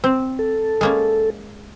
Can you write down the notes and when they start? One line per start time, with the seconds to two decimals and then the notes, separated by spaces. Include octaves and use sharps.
0.04 C4
0.39 A4
0.81 G#3 A#3 C#4